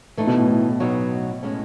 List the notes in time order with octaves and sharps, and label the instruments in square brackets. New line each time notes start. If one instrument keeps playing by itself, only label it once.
[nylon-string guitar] E3 A3 D#4
[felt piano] B2
A2
A2
[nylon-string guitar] B2 F#3 B3 D#4 F#4
A2 G#3 C#4